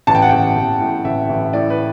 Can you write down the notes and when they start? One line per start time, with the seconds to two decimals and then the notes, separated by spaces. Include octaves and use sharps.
0.07 A1 A5
0.15 G5
0.22 F#5
0.29 A1 G5
0.55 A1
0.80 A2
1.04 A1 E5
1.29 A1
1.53 A2 D5
1.70 B4